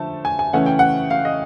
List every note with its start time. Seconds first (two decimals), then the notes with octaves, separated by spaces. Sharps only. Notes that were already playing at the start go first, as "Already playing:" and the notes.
Already playing: D3 F3 A3 A5
0.25 G#5
0.39 G#5
0.53 C#3 E3 A3 C#4 F#5
0.66 G5
0.79 F#5
1.11 F5
1.25 D#5